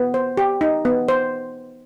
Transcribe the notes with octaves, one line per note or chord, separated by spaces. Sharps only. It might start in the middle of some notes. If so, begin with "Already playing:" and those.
Already playing: B3
C5
G4
D#4
B3
C5